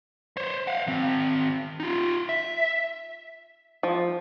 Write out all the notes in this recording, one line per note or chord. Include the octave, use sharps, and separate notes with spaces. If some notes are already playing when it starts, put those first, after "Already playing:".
C5 C#5
F5 F#5
D#3 C4
D#4 F4
E5
F3